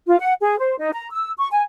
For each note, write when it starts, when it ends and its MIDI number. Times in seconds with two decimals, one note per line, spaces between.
0.07 0.19 65
0.19 0.33 78
0.41 0.56 68
0.59 0.75 72
0.79 0.89 63
0.93 1.10 82
1.11 1.31 88
1.37 1.47 85
1.51 1.61 80